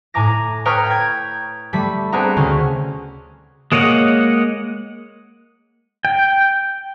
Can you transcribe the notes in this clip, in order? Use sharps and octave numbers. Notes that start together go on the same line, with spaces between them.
A2 G#5 A#5 D6 A#6
B4 C#5 G5 A#5 D#6 F6
G5 G#6
G3 A3 B5
B3 C4 D4 G#4 F#5 A#5
D2 C#3 C#4
G#3 A#3 C#5 D#5 F#5
G5